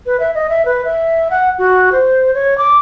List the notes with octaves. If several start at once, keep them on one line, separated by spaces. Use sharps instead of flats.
B4
E5
D#5
E5
B4
E5
F#5
F#4
C5
C#5
D6